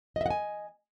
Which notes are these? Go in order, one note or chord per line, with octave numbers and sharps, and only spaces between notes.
D#5 E5 F#5 G#5